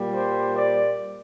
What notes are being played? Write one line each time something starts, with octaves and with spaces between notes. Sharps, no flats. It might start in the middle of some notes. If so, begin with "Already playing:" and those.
Already playing: A#2 G3 A#3
C5
D5